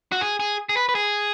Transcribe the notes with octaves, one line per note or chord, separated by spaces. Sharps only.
F#4
G#4
G#4
G#4
B4
B4
G#4